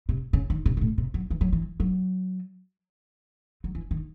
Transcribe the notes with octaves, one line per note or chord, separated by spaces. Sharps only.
C3
C#3
D#3
C3
C3
A2
C3
F#3
E3
F#3
E3
F#3
F#3
E3
D#3